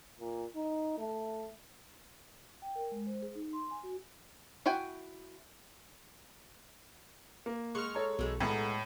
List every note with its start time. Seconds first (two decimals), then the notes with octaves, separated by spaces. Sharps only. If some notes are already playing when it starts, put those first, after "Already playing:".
0.20 A#2
0.55 D#4
0.98 A3
2.62 G5
2.75 A#4
2.91 G#3
3.07 C5
3.22 G#4
3.35 D#4
3.53 C6
3.71 G#5
3.83 F#4
4.66 E4 F#4 G5 G#5
7.46 A#3
7.75 G#3 F#5 C#6 F6
7.95 A4 C#5 A#5
8.19 B1 E3 G#3 A3
8.40 B1 A2 G#3 B3 A4 F#5 A#5